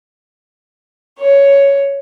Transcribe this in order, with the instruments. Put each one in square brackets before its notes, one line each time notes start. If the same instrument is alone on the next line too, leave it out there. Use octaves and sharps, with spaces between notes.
[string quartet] C#5